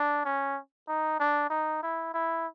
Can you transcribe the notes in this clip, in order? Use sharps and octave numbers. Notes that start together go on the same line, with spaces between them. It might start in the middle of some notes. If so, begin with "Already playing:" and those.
Already playing: D4
C#4
D#4
D4
D#4
E4
E4